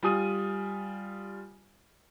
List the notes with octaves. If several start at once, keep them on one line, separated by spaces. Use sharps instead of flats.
G3 F4 G#5 D#6 D#7